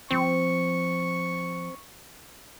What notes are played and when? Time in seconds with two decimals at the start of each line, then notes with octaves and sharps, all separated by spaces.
0.11 F3 C4 C#6